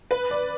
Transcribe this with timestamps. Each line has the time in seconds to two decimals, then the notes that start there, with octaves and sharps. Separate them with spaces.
0.11 B4
0.31 D5